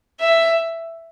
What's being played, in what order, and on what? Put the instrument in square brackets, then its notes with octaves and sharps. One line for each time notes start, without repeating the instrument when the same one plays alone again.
[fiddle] E5